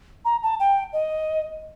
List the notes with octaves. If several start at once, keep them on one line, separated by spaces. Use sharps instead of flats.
A#5
A5
G5
D#5